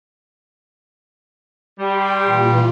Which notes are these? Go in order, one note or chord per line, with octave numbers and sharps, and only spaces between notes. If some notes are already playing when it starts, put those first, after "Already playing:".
G3 G4 G5 C6
A#2 E3 F4